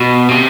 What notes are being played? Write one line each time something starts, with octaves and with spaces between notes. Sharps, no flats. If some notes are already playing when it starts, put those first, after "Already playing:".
Already playing: B2
C3